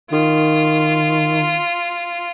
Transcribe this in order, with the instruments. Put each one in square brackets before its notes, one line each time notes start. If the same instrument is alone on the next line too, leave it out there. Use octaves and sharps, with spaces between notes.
[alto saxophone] D#3 [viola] F4